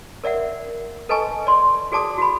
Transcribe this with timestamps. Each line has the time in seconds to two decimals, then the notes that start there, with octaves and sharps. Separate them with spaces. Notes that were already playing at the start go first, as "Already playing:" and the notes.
0.24 A#4 D5 E5 F#5
1.09 A4 B4 D#5 G#5 A5 C#6
1.47 D5 C6
1.92 F#4 G#4 D5 A5 D6 D#6
2.18 F#4 B5